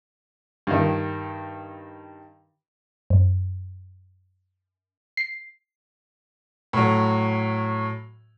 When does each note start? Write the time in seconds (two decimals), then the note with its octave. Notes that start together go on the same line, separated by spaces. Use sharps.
0.67 G2 D#3
3.10 F#2
5.17 C7
6.73 A2 F#3